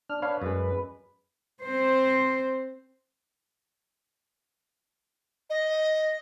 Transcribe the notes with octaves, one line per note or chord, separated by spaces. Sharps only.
D4 F6
D4 B4 C#5 F5
F#2 G#3
C4 C5
D#5